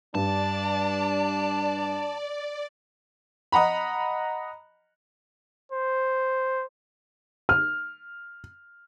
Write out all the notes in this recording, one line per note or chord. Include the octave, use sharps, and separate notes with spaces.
G2 D4 D5 A5
D#5 F#5 A#5 B5
C5
F6